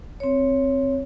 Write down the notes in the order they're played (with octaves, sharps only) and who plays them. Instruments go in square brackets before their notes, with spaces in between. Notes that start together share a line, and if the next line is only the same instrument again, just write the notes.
[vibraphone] C4 C#5